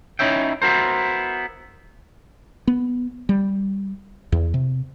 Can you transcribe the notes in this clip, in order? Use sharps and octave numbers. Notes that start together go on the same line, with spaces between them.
C#4 D#4 E4 C#5 E5 G5
B3 E4 F#4 A#4 C5
B3
G3
E2
C3